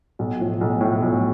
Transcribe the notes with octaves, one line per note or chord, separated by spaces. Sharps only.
B1
A2 F3
B1
A2 F3
B1